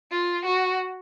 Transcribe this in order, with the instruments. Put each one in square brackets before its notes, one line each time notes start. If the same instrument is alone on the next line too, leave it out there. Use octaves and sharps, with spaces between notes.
[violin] F4
F#4